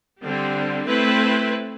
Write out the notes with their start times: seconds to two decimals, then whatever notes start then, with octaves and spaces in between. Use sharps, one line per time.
0.22 D3 G3 C4
0.87 A3 C4 E4 B4